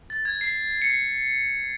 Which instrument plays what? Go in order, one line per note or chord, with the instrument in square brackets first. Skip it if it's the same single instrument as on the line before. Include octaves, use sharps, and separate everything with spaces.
[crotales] A6
G#6
C7
C#7
C7